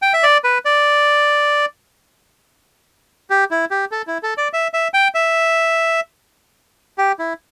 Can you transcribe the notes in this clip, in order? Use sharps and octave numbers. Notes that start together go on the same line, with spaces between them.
G5
E5
D5
B4
D5
G4
E4
G4
A4
E4
A4
D5
E5
E5
G5
E5
G4
E4